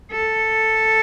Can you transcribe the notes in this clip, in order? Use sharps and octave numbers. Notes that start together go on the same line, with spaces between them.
A4